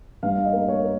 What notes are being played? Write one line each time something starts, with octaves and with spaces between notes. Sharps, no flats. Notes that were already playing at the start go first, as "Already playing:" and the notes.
G2 F5
D#5
A#3
C#5
A#3